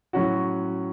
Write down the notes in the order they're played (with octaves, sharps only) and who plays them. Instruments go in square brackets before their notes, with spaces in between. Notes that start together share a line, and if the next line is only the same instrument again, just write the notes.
[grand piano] A2 F#3 C#4 F#4